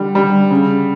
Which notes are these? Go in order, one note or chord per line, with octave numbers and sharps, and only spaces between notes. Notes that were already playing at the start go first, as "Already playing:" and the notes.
Already playing: D3 G3
G3
C#3